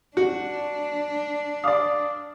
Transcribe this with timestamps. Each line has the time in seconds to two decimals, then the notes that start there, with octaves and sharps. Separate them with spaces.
0.17 D4 F#4
1.64 D5 F5 D6 D#6